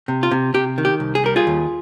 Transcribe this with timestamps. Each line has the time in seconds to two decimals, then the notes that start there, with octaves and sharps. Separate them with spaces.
0.08 C3
0.23 F4
0.31 C3
0.54 C3 G4
0.78 D#3
0.85 G4
1.00 C2
1.15 G#4
1.24 G3 A#4
1.36 F4 G#4
1.47 D#2